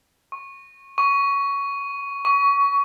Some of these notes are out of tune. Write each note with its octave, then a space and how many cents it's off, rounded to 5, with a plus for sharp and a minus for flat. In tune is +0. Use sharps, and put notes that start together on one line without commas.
C#6 -25
C#6 +15
C#6 +25